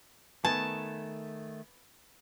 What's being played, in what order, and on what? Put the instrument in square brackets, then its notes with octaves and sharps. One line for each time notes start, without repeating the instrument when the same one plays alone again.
[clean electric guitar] D#3 A3 [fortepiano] B3 G#5 [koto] A5